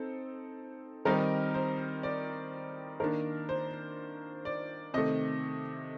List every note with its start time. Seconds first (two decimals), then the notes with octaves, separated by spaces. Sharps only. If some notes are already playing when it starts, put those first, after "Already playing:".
Already playing: C4 D#4 A4 C5
1.05 D#3 G3 C4 D#4 A#4
1.54 C5
2.03 D5
3.00 D#3 A#3 D4 A#4
3.49 C5
4.45 D5
4.94 C3 D#3 A3 D#5